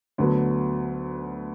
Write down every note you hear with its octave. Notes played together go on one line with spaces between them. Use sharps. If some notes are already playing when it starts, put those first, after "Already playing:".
D2 D3 F#3 B3